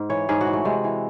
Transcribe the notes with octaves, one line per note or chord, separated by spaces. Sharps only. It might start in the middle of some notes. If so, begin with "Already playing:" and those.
Already playing: G#2
E3 C#5
G#2 G#4
F#4
E3
A3
C3 G#3
E3